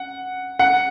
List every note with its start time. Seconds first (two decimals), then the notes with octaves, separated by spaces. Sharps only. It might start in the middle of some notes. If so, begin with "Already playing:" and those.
Already playing: F#5
0.59 F#5